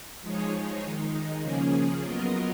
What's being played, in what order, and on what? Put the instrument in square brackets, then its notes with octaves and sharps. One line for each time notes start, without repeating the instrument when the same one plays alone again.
[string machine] F3 G#3 D#4 G#4 C#5
D#3 G#3 D#4
C#3 F3 A#3 C#4 G#4
F#3 B3 F4 A#4 D#5